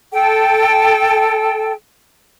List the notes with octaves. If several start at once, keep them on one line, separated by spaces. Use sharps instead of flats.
A4 G5